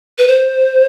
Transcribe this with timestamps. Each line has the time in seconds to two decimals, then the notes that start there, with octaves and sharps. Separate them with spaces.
0.18 B4
0.28 C5